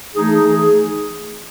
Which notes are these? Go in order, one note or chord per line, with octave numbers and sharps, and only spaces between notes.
E3 A3 D#4 G#4
E3 A3 D#4 G#4